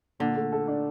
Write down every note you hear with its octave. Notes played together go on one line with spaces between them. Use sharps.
A#2 D3
A3
A4
D4